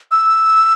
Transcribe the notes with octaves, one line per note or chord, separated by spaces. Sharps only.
E6